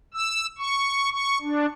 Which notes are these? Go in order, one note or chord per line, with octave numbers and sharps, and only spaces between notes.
E6
C#6
C#6
D4